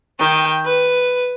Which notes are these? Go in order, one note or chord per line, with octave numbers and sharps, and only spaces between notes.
D#3 G5
B4